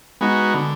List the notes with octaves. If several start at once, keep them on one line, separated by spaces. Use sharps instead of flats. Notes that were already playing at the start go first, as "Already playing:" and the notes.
G#3 B3 D#4 F#4
D3